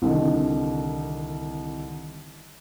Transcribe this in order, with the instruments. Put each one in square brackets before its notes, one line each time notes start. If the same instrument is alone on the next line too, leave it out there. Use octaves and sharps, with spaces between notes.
[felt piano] C2 D3 D#3